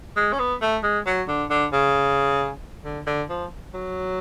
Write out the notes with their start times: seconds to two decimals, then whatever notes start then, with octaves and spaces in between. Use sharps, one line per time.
0.17 G#3
0.33 C#4
0.39 B3
0.62 A3
0.83 G#3
1.06 F#3
1.28 D3
1.50 D3
1.73 C#3
2.84 D3
3.07 D3
3.29 F3
3.74 F#3